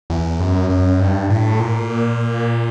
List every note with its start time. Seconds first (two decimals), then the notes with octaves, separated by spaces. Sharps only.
0.10 E2
0.40 F#2
0.70 F#2
0.99 G2
1.30 A2
1.60 A#2